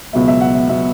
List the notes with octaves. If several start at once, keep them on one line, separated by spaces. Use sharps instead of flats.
C#2 B2 F#3 B3 E5
E5
F#5
E5
B2 F#3 B3 E5